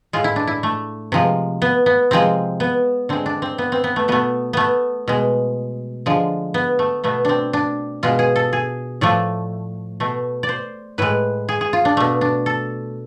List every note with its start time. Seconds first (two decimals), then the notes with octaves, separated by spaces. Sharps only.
0.13 A2 G#3 F4
0.24 E4
0.36 D4
0.47 E4
0.63 A3
1.12 C3 F3 G#3
1.62 B3
1.86 B3
2.11 C3 F3 G#3 C4
2.60 B3
3.09 D3 G#3 C4
3.26 D4
3.42 C4
3.58 B3
3.72 C4
3.84 B3
3.96 A3
4.08 B2 A3 B3
4.53 A3 B3
5.08 B2 G#3
6.06 D3 F3 G#3
6.54 B3
6.79 A3
7.04 B2 A3 B3
7.25 C4 D4
7.53 D4
8.03 B2 G#3 F4
8.19 G#4
8.36 A4
8.53 G#4
9.01 A2 F3 A3 D5
10.00 B2 A3
10.43 D5
10.49 C5
10.98 A2 G#3 B4
11.49 G#4
11.61 G#4
11.73 F4
11.85 D4
11.97 B2 A3
12.21 D4
12.46 A4